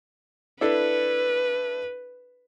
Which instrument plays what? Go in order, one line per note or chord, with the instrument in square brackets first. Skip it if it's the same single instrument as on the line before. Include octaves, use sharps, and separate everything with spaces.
[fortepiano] D4 E4 A4 [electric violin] B4